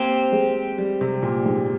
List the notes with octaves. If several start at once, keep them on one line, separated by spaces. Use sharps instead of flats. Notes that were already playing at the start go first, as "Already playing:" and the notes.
Already playing: A#3 C4 G4 C5
G#3
G3
C3
A#2
G#2